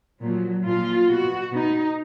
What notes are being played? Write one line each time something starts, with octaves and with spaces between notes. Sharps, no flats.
A#2 F3 F#3
A#2 F3 F4
B2 F#4
B2 D#4